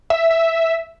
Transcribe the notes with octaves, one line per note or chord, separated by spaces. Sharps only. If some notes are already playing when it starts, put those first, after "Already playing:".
E5
E5